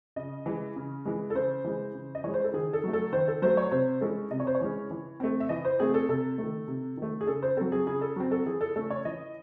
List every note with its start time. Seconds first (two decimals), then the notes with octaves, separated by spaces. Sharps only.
0.16 C#3 D#5
0.46 E3 G#3
0.76 C#3
1.05 E3 G#3
1.30 A4
1.35 C#3 C5
1.64 E3 G#3
1.95 C#3
2.15 D#5
2.24 E3 G#3 C#5
2.34 C5
2.44 A4
2.54 D#3 G#4
2.73 A4
2.84 F#3 A3
2.93 A4
3.13 D#3 C5
3.28 A4
3.42 F#3 A3 C5
3.57 C#5
3.71 C3 C5
4.01 E3 G#3 C#4 A4
4.31 C3 D#5
4.40 C#5
4.47 C5
4.55 C#5
4.61 E3 G#3 C#4
4.91 E3
5.20 A3 C4
5.40 E5
5.49 E3 D#5
5.65 C5
5.80 A3 C4 G#4
5.94 A4
6.09 C3 A4
6.38 A3
6.43 D#3
6.68 C3
6.97 D#3 A3
7.21 G#4
7.27 C#3 A4
7.43 C5
7.57 F#3 C4 A4
7.72 G#4
7.87 C#3 G#4
8.01 A4
8.16 F#3 C4
8.31 A4
8.46 E3 G#4
8.61 A4
8.76 A3 C#4 A4
8.90 C#5
9.05 E3 D#5